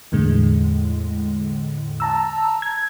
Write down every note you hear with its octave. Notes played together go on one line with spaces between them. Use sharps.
E2 A2 D3 G#3
A5 A#5 E6
G#6